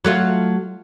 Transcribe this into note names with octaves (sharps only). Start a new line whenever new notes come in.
F#3 A3 F4